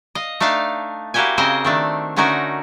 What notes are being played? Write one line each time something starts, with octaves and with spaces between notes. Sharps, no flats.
D#5 F5
A3 D4 D#4 F5 A5
A#3 E4 F#4 G4 G5 G#5
C#3 C4 C#4 A#4 C5 D#5
D#3 A3 D4
D3 A3 C#4 D#4 F#4 A#4